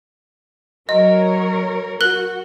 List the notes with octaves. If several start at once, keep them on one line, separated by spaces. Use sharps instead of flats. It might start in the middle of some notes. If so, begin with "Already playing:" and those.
F#3 A#4 C#5 D#5
F#4 A#4 F#6 F#7